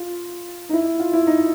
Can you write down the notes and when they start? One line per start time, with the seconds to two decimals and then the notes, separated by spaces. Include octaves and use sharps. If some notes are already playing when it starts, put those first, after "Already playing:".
Already playing: F4
0.69 D#4
0.73 E4
1.00 F4
1.13 E4
1.27 D#4